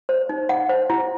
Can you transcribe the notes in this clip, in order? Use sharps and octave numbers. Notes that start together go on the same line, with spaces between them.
C5
D#4
D#4 F#5
C5
E4